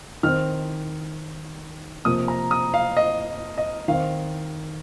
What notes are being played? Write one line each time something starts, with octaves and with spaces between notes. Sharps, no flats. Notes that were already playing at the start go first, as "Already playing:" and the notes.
D#3 C4 F6
C3 F3 A#3 D#6
A#5
D#6
F5
D#5
D#5
D#3 C4 F5